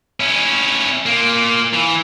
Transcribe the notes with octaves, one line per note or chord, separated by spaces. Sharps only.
C#4 E4
A#3 F4
E3